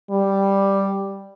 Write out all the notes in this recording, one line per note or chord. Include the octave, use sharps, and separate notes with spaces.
G3